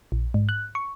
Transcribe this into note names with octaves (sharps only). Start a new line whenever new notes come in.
A#1
G#2
F#6
C#6